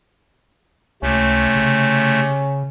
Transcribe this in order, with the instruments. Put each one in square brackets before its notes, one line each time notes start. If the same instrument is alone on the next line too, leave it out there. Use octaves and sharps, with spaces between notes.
[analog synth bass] C#2 [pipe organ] C3 A3 [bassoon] C#4
[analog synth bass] C#3